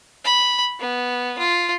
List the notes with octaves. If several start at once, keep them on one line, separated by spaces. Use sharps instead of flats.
B5
B3
F4